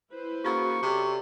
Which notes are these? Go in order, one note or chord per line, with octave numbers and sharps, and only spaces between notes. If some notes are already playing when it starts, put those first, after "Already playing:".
E4 B4 C5
A#3 C#4 F#4 G#4 C#6
C3 F#3 A4 D5 D6